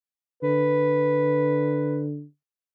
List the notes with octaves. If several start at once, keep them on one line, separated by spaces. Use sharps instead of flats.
D3 B4